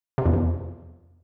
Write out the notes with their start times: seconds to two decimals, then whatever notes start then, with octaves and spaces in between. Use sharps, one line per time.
0.18 C3
0.26 E2
0.33 F2